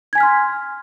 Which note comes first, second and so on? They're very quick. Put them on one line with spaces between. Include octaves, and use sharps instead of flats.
G#6 G#5 B6 F6 C6